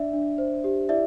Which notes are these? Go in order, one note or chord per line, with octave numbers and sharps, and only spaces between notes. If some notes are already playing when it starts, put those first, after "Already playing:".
Already playing: D4 D5 E5
D4
C5
G4
E4 D5 E5